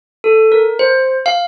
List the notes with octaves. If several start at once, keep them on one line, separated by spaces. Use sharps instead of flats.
A4
A#4
C5
F5